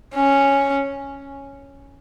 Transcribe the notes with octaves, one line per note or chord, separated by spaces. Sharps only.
C#4